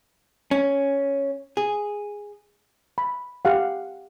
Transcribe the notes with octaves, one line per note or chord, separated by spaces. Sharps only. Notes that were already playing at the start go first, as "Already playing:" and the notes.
C#4
G#4
B5
G4 F5 F#5